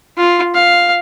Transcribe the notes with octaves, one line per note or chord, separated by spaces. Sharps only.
F4
F5